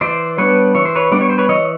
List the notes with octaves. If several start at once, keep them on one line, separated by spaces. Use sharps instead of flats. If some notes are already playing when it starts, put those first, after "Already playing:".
E3 C5 D5
G3 B3 D4 B4 C#5
E3 C#5
C5
B4 C#5
G3 B3 D4 D5
C#5
C5
B4 C#5
E3 C#5 D#5